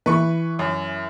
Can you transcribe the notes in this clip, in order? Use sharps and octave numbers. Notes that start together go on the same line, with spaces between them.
E3 B4 C#6
F#2